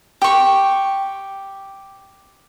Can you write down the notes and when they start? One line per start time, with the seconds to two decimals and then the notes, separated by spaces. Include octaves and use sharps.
0.22 G4 C#6